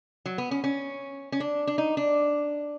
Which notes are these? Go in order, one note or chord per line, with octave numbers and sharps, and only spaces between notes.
F#3
B3
C#4
C#4
C#4
D4
D4
D#4
D4